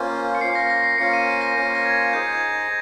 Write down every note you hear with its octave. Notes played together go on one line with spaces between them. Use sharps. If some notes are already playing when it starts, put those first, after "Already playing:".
Already playing: A#3 C#4 F4 C5
C#7
A#3 C#4 F4 C5 C7
A#6
A#6
C7
A#3 C#4 F4 C5 C#7
D#7
A#6
A#3 C#4 F4 C5
A#6
G#6
D#4 G#4 C5 G6
G#6